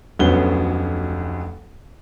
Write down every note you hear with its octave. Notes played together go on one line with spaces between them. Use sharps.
F1 D2 F#3 B3 C#4 G7